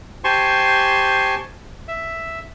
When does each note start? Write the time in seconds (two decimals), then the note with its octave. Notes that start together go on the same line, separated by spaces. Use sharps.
0.24 G4 C5 G#5 A5 C6 C#6
1.88 E5